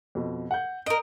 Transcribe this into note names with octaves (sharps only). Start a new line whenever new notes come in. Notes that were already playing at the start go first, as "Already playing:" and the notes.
F2 B2
F#5 G6
A#4 D#5 D7